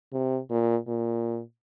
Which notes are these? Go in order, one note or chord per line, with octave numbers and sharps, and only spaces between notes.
C3
A#2
A#2